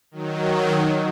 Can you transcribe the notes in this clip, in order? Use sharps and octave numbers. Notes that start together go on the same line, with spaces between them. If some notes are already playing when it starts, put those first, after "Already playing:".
D#3 F#3